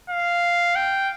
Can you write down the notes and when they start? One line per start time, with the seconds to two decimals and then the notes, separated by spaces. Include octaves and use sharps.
0.10 F5
0.76 G5